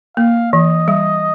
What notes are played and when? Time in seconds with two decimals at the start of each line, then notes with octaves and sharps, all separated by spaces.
0.17 A#3 F5
0.52 E3 D#5
0.88 G3